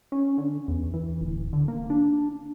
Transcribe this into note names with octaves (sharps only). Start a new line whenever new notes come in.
C#4
D3
E2
E3
D1
D3
A#3
D4